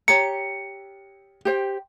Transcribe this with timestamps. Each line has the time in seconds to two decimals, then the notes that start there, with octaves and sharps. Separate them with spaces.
0.08 G4 C#5 A#5 C#7
1.45 G4 C5 G5